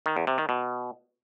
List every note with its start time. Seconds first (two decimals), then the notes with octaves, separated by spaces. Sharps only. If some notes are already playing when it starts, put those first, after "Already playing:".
0.06 D#3
0.17 E2
0.27 C3
0.38 D#3
0.49 B2